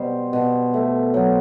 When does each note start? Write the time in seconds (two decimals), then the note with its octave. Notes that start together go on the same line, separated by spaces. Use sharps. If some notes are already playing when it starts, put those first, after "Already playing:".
Already playing: B2 G3 C5
0.33 B2
0.74 A3
1.14 F#3